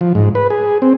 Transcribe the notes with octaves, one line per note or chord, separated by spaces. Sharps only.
F3
G#2
B4
G#4
C4